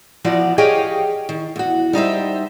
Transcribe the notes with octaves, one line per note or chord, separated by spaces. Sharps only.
E3 F3 B3 F#4 D5
G4 G#4 C#5 D#5 F5 G5
D#3
E2 F#4
G3 D#4 C5 E5